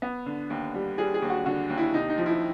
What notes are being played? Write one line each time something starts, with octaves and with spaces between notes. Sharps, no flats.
B3
D3
D#2
G3
G3 G#4
G#4
D#2
F#4
D3 F#4
D#2
E4
C3 D#4
D#4
F3
E4